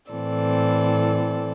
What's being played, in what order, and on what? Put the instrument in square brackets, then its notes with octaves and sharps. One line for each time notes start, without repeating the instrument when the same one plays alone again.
[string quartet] A2 E3 C4 A4 D5